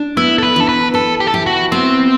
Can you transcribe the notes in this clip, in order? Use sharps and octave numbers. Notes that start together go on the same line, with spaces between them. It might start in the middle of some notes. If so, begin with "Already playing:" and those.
Already playing: D4
B3 E4
A4
B4
E3 A4
B4
A4 B4
G4
A4
E4 G4
F#4
B3 C4